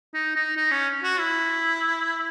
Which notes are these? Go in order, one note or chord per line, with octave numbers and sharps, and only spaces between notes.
D#4
D#4
D#4
C#4
F#4
E4